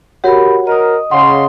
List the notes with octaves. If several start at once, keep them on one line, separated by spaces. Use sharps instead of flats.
F#4 G4 A#4 C#5 F#5 B5
A#4 D#5 D#6
C#3 F#5 C6